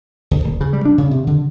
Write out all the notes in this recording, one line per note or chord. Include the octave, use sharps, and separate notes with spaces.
D2
D#1
C#3
G3
D4
C#3
C3
D3